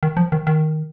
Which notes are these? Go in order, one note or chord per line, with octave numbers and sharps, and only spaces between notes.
D#3
F3
D#3
D#3